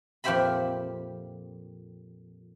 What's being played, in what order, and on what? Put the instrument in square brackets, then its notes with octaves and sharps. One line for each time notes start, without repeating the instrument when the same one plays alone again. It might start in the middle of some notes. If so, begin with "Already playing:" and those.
[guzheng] F2 A#2 G4 C5 E5 B5